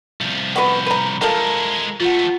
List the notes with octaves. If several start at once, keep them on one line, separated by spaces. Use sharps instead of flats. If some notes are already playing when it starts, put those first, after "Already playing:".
C2 F3
B3 F#4 B4
B4 A#5
F3 G#3 E4 A4 A#4
F3 A3 F4 F#5